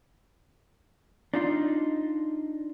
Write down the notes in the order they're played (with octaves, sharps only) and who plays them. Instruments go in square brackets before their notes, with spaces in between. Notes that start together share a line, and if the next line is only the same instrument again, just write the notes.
[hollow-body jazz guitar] D4 D#4 F4